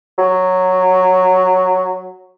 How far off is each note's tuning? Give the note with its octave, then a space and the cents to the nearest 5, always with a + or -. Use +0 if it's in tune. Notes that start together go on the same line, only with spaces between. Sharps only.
F#3 -5